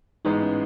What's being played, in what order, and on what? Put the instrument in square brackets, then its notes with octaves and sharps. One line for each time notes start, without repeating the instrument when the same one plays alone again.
[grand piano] A1 G#2 E3 G#3 B3 [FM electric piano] D#4
[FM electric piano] C#4